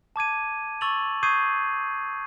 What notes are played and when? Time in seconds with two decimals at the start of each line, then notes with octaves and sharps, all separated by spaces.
0.16 A5 D6 G#6 D#7
0.81 C#6 E6 A6 D#7 F7 F#7
1.23 C#6 D#6 G6 G#6 C7 D#7